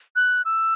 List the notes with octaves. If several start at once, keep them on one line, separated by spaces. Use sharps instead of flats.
F#6
E6